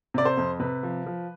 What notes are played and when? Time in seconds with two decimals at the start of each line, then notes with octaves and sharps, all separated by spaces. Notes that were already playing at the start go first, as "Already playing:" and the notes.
0.14 C3 D5
0.25 C5
0.37 F2
0.60 C3 B4
0.83 F3
1.06 F3